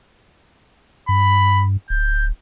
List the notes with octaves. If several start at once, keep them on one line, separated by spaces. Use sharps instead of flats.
G2 B5
D1 G6